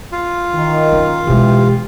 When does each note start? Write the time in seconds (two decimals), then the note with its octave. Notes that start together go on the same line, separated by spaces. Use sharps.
0.12 F4
0.55 D#3
0.93 F#2
1.27 B2 E3 G#3 G4